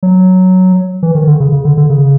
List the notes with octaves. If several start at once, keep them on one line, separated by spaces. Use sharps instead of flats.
F#3
E3
D#3
D3
C#3
C#3
D3
D3
C#3